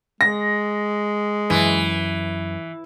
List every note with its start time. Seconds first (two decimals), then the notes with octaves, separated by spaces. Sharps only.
0.21 G#3 A#6
1.50 F#2 E3